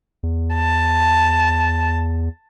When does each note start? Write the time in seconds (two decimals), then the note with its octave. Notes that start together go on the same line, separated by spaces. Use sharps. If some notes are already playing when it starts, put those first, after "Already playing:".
0.23 E2
0.55 A5